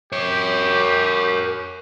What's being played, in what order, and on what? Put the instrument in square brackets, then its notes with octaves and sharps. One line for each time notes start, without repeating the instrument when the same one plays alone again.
[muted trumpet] G4 [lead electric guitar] A#4 C#5